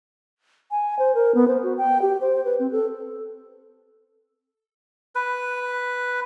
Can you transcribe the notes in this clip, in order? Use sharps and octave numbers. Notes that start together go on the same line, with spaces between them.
G#5
C5
A#4
B3
C5
F#4
G5
G4
C5
B4
C4
A4
B4